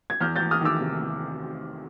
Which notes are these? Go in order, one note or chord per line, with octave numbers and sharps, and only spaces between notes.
G#6
E2 F6 G6
E2 G6 A6
D#6 F6
D#3 D6 E6
C3
E2